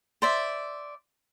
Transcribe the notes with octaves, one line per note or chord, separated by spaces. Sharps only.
C5 D5 E5